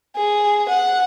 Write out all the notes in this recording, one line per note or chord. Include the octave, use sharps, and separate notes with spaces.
G#4
F#5